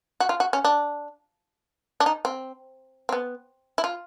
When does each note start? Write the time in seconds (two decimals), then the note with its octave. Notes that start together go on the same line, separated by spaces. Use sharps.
0.20 F#4
0.29 F4
0.40 F#4
0.53 C#4
0.65 D4
2.00 D4
2.06 D#4
2.25 C4
3.09 C4
3.12 B3
3.78 E4
3.84 F4